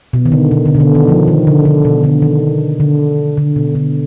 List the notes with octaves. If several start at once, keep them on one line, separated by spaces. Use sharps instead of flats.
B2
D#3
D3
B2
D3
B2
D3
D#3
F3
D#3
D3
D3
B2
D3
D#3
D3
D3
B2
D3